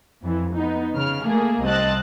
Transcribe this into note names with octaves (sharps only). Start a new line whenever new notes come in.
F2 E3
B3 D#4
C#3 F6
A3 A#3 G#4
C2 C4 D#5 A5 F#6 A6